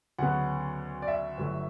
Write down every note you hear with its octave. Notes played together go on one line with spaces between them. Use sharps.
D2 C#3 F#3 B3 F#5
D5
E5
G1 G2 F#3 A3